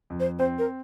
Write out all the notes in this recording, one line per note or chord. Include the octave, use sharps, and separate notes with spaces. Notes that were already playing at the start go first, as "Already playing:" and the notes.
F2
C5
C4 C5
A#4